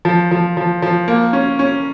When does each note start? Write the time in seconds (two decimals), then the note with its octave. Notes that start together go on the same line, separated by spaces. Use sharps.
0.05 F3
0.31 F3
0.57 F3
0.82 F3
1.08 A#3
1.33 C#4
1.59 C#4